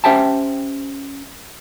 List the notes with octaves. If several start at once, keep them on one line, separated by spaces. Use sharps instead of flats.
C#4 G4 C5 E5 G5 A5